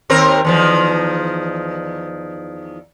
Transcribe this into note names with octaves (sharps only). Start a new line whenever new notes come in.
D#2 C4 A#4
E2 D#3 F3